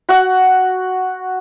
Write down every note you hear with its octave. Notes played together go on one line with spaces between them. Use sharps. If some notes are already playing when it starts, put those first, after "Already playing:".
F#4 F#5